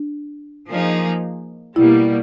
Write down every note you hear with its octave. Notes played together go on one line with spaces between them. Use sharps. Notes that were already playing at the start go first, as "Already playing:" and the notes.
Already playing: D4
F3 A#3 D#4 G#4
B2 G3 A#3 E4